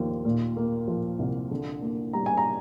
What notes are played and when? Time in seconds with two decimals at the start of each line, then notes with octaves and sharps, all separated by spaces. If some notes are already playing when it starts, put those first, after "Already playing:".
Already playing: D#2 F3
0.25 A#2
0.57 A#3
0.88 F3
1.19 C2
1.51 D3
1.82 A#3
2.13 G3 A#5
2.26 G#5
2.37 A#5